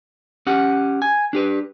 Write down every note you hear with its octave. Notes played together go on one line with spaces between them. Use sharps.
C#4 G4 F#5
G#5
D4 G4 B4